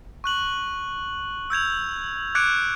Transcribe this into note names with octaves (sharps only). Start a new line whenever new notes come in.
C#6 F#6 F#7
E6 G6 G#6 F7
D6 F#6 G#6 C#7 D7